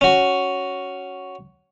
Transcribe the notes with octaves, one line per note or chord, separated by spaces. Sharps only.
C#4 F#4